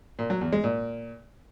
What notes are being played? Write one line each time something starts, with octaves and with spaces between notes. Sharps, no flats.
A#2
F#3
E2
G#3
A#2